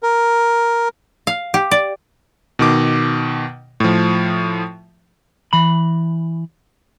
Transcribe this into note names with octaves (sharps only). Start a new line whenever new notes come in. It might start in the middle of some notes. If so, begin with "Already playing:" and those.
A#4
F5
G4
D5
B2 D#3 D6
A2 F3
E3 B5